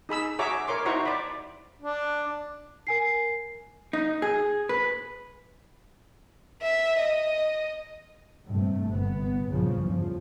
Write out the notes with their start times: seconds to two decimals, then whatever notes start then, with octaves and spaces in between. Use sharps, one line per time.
0.09 D#4 G#4 B5 E6
0.39 F#4 G#4 C#5 E5 A#5 D6
0.67 A#4 C#5 C6 D6
0.85 D#4 E4 F#4 C5 A#5 C#6
1.05 D5 B5
1.82 D4
2.87 A#4 G#5 C7
3.93 D#4
4.22 G#4
4.69 B4
6.62 E5
7.00 D#5
8.49 G2 C3 A3
8.92 G1 B3
9.48 A#1 G2 C#3 F3
9.77 E2 G2 F3